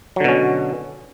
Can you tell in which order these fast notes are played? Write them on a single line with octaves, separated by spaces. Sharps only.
F#3 D3 B2 C#4